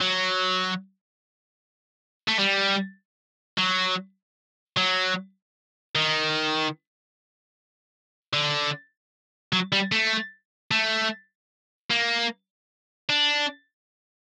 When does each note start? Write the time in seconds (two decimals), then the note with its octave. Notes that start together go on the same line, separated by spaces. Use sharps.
0.01 F#3
2.28 A3
2.39 G3
3.58 F#3
4.77 F#3
5.95 D#3
8.33 D3
9.53 F#3
9.72 G3
9.92 A3
10.71 A3
11.90 A#3
13.09 D4